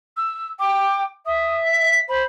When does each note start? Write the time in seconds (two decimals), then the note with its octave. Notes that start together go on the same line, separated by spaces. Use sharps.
0.17 E6
0.60 G5 D6
1.26 E5 D#6
1.66 B6
2.09 C5 B5